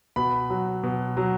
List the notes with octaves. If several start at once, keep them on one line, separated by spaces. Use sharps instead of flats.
B2 B5
F#3
B2
F#3